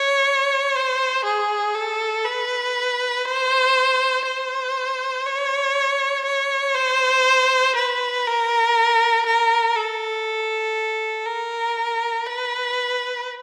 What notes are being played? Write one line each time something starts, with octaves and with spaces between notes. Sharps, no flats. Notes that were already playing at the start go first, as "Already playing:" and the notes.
Already playing: C#5
C5
G#4
A4
B4
C5
C5
C#5
C#5
C5
B4
A#4
A#4
A4
A#4
B4